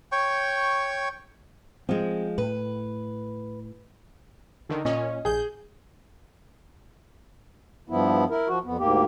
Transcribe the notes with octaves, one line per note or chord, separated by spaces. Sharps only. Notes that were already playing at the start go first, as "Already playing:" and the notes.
C#5 G5 C#6
F3 G#3 C4
A2 B4
D3 D#3
A#2 C#4 D#5
A#1 G#4 G6
G2 F3 B3 E4
E4 A#4
F3 F#4
F2 B3
D2 G#2 A#3 G4